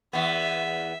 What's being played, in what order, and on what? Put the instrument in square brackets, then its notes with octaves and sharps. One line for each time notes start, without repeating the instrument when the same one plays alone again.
[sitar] E2 B3 [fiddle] E5